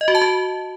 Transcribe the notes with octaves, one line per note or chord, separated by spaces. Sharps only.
D#5
F#4
A5
F#4